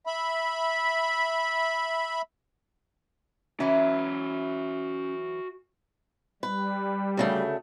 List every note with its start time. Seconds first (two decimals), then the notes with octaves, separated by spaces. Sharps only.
0.07 E5 B5
3.60 E3 F#3 C#4 E4 F#4 E5
6.43 G3 B4
7.17 D2 C#3 A3